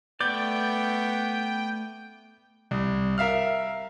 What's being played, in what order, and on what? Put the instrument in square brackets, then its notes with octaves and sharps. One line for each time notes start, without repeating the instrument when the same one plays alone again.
[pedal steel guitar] A3 D5 [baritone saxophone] B3 [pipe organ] G5 [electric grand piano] G6
[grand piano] C2
A#4 E5 F5 F6